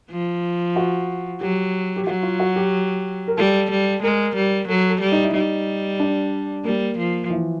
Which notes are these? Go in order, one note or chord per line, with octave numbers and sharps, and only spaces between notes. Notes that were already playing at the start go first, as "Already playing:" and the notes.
F3
F#4
F#3 G4
G4
F#3 F#4
F4
F#4
G4
A#4
G3 A4
G3
G#3 A#4
G3
F#3 A4
A4
G3
D#4
E4
G3 D#4
D4
G3 A#3
F3
E3